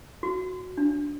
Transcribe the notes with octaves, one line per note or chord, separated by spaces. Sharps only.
F#4
D4